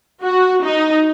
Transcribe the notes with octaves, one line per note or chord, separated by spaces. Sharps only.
F#4
D#4